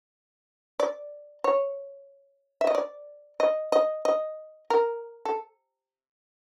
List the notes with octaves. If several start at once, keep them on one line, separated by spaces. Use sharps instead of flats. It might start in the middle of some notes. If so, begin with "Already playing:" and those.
D5
C#5
E5
D#5
D5
D#5
D#5
D#5
A#4
A4